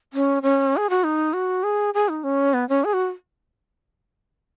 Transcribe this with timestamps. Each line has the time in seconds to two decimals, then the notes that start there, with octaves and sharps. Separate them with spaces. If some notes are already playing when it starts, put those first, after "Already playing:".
0.13 C#4
0.43 C#4
0.77 G#4
0.90 F#4
1.04 D#4
1.33 F#4
1.64 G#4
1.94 G#4
2.09 D#4
2.24 C#4
2.54 B3
2.69 C#4
2.84 G#4
2.93 F#4